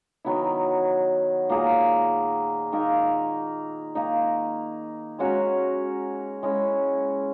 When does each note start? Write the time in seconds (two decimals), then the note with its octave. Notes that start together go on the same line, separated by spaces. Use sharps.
0.24 D#3 F#3 B3 E4
1.49 A#2 A#3 D#4 G#4
2.72 D#3 A#3 D#4 A#4
3.95 D#3 A#3 D#4
5.19 G#3 C#4 F#4 A#4
6.43 G#3 C#4 E4